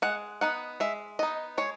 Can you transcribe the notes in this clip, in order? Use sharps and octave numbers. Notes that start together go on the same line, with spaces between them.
G#3 F#5
B3 D#4 F#5
G#3 E5
B3 D#4 D#5
G#3 C#5